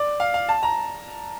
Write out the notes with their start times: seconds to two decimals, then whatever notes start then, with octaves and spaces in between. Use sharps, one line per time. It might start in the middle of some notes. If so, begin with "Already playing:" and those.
Already playing: D5
0.20 F5
0.34 F5
0.49 A5
0.63 A#5